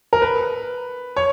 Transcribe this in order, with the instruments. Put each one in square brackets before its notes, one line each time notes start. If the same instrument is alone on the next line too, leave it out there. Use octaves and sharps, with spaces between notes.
[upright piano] A#4
B4
C#5